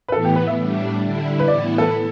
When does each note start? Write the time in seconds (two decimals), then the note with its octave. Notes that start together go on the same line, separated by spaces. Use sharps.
0.08 B4
0.12 A2 E3 B3 A4
0.25 G4
0.36 B4
0.47 E5
0.58 A2 G3 D4
1.03 D3 G3 E4
1.39 B4
1.48 A2 E3 B3 E4 D5
1.78 A4